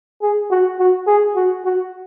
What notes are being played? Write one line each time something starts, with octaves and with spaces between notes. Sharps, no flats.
G#4
F#4
F#4
G#4
F#4
F#4